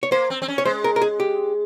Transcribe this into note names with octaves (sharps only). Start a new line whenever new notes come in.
C#5
A#3 C5
C4
C4
C#4
C#5
G#3 C5
A#4
A#4
G#4
G4